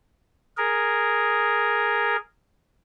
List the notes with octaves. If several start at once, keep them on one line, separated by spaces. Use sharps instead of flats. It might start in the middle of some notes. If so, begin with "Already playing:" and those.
G#4 A#4